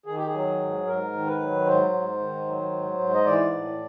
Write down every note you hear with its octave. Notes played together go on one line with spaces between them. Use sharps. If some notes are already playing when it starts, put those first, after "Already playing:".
D#3 G#4
G4
G#4
F#3
G#2
G#2 A#4
D#3
B4
F#3
G#2 C5
G#2
D#3
F#3
G#2
G#2
D#5
E3 D5
A2